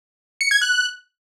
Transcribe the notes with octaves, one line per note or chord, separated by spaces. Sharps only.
C#7
G#6
F#6